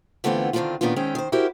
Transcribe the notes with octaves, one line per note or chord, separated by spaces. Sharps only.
D3 E3 A3 B3 C4 F4
D3 D#3 G3 C4 D4 F4
A#2 D#3 B3 C#4 D4 F4
D#3 G#3 C4 C#4 E4
D#3 C5
E4 F#4 G4 A#4 C5